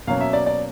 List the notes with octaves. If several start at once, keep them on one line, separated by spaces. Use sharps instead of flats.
B2 F#3 A#3 C#4 F5
E5
D5
D5